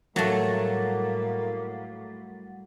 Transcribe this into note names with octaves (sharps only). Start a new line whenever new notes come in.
A2 F#3 G3 A3 A#3 F#5 A6